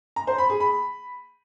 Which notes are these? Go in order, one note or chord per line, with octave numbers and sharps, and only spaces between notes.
A#5
C5
B5
G#4
B5